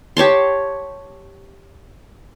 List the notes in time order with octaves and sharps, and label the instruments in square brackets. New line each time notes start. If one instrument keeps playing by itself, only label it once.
[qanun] G4 C#5 A5 C6